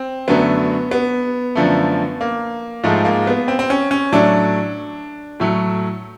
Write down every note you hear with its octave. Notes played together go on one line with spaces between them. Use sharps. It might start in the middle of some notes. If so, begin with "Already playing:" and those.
Already playing: C4
F#2 D3 F#3 A3 B3
B3
F#2 D3 F3 A3
A#3
G#2 F3 G#3 A3
A#3
B3
C4
C4
C#4
C#4
A2 F#3 A3 D4
A2 F#3 A3